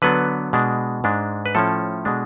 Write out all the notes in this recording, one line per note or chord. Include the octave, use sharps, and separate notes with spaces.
D3 F#3 B3 D4 B4
B2 G#3 D4
G#2 G#3 D4
B4
A2 F3 A3 C#4 A4
B2 G#3 D4